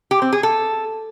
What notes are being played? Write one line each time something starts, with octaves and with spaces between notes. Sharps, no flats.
G4
C4
G#4
A4